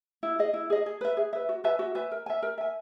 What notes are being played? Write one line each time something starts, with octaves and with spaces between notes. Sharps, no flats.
E4
G#4 D#5
E4
G#4 D#5
G#4
B4 E5
G#4
B4 E5
F#4
B4 E5 G#5
F#4
B4 E5 G#5
A#4
E5 G#5
A#4
E5 G#5